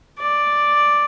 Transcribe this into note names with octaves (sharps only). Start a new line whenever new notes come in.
D5